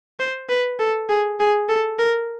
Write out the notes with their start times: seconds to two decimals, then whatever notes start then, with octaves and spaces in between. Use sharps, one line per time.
0.20 C5
0.49 B4
0.80 A4
1.09 G#4
1.40 G#4
1.69 A4
1.99 A#4